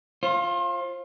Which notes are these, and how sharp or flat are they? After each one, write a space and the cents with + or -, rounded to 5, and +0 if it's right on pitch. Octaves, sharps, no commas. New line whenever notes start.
F4 -5 C5 +35